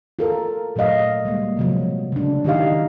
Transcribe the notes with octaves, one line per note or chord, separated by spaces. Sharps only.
F4 A4 A#4
A#2 F#3 A3 D#5 F5
G3 G#3 A#3
C3 F3 F#3
C#3 D4
D#3 D#4 E4 G4 D#5 F5